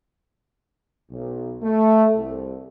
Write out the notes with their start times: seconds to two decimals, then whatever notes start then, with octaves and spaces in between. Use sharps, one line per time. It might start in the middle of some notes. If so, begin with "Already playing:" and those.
1.10 B1
1.63 A3
2.15 C2